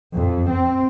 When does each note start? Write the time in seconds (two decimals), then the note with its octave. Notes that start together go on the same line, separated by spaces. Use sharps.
0.16 F2
0.52 C4